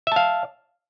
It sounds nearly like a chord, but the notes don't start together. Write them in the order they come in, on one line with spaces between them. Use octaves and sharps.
E5 A5 F5